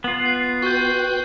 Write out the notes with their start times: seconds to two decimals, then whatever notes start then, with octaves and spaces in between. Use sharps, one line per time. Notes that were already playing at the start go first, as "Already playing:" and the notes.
0.04 B3 F4 F#7
0.26 F#6 C7
0.62 F#4 B4 G5 C#6 F#6 G6